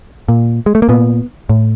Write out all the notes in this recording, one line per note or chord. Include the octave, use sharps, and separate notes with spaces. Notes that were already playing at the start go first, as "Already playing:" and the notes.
A#2
G#3
A3
A#3
A#2 B3
A2